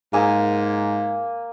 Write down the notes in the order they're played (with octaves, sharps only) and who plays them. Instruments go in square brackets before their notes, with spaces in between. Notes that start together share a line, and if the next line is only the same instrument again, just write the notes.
[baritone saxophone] G#2 [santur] A#3 G#5